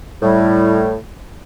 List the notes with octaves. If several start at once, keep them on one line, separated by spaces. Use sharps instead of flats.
A2 G3